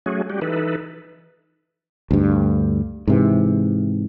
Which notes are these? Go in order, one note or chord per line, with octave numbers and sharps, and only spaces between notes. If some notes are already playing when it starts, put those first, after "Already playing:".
F#3 A3 C#4 F#4 G#4
G3 F#4 G4
E3 D#4 A4 B4
D2 G2
G#2 C3 E3